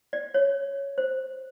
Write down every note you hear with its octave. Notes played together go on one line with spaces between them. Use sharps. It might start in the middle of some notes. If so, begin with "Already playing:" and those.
D5
C#5
C5